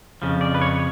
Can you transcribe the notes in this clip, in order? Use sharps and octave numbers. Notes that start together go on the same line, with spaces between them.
F2 C#3 F3
D5
B4
C#5